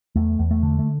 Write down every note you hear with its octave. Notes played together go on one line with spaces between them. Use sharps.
E2 A3
E2
A3
D3
A3